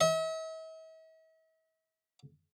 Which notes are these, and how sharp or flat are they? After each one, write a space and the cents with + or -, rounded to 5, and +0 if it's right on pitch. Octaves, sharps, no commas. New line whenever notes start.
E5 -45